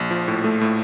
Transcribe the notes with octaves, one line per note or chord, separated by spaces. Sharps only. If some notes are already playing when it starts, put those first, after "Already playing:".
Already playing: A#1
F3
A2
A3
A2